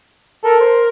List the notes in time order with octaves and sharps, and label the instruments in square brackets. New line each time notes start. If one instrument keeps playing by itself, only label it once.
[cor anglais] A4 [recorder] A#4
[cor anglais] C5